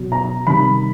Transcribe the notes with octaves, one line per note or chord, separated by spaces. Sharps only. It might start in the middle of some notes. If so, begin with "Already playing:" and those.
Already playing: B2 F#3
A#5
C3 D#3 G3 B5